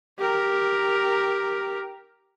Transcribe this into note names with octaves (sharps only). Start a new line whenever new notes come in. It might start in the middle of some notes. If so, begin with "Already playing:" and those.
G4 A#4